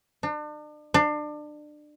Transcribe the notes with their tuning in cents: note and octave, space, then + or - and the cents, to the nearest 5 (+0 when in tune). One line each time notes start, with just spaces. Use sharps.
D4 +40
D4 +30